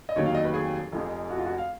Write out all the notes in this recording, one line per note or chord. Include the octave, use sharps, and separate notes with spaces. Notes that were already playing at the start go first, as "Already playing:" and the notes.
D#5
F1 D#2 D#3 F#3 C#5
F5
D#5
B4
G#4
F1 F2 F3 G#3
F#4
F4
F#4
F5